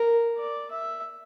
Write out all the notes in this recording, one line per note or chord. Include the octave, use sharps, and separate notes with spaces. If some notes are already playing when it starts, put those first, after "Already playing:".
Already playing: A#4
D5
E5